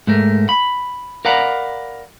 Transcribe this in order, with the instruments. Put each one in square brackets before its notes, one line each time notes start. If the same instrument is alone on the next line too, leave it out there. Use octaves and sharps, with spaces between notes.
[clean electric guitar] G#2 A3 A#4
B5
A#4 D5 F5 F#5 A#5 B5